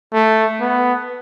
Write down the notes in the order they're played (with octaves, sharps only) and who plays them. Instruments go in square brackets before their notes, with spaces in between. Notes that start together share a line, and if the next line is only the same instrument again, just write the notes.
[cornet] A3
B3